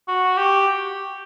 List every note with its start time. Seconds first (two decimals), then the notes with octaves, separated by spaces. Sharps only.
0.08 F#4
0.37 G4